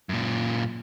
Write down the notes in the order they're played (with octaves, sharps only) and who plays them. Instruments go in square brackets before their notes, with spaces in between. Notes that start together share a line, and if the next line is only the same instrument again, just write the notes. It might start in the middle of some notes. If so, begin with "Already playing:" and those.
[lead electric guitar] F#2 A#2